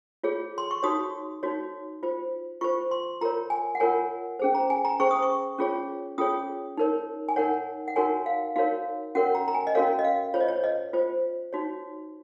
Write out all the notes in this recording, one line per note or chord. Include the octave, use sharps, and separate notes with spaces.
F4 G#4 C#5
C6
C#6
D#4 F#4 C#5 D#6
D#4 F#4 C#5
F4 C5
F4 C5 C#6
C6
F4 A#4 C#5 A#5
G#5
F#5
F4 A#4 C#5 G#5
C#4 G#4 C5
A#5
G#5
A#5
C#4 G#4 C5 C#6
D#6
C#6
C#4 F4 G#4 C#5
C#4 F4 G#4 C#5 D#6
D#4 A#4 C#5
G#5
D#4 A#4 C#5 F#5
F#5
D#4 F#4 A#4 C#5 G#5
F5
D#4 F#4 A#4 C#5 F5
C#4 F#4 A#4 C#5 F#5
A#5
A#5
G#5
D#5
C#4 F#4 A#4 C#5 F5
D#5
F5
F4 C5 C#5
D#5
C#5
D#5
F4 C5
D#4 F#4 C#5